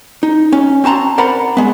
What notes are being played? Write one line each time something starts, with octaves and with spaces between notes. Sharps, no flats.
D#4
C#4
C4 F#4 A5 A#5 C6
A#4 C5 D5 F#5 A#5 B5
G#3 B3